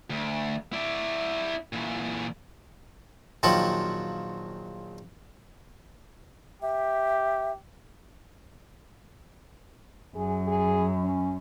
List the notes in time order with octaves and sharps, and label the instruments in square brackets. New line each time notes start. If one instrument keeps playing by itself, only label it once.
[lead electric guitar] D2
E4 D5
A#2 E3
[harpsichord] A#1 D#3 F3 F#3 F#4 A5
[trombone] G4 [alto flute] E5
[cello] F#2 [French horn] G#4
[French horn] G#4
C#4